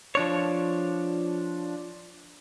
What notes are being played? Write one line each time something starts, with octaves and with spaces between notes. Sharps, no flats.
F3 D4 C#5